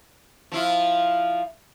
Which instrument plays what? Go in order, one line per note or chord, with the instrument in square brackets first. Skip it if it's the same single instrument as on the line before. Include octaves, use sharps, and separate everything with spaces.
[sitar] F3 E4 F4